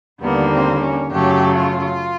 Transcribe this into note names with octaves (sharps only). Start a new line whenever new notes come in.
D#2 D3 G3 A#3 B3
C4
C#4
F#2 C#3 F#3 A3 G4
F4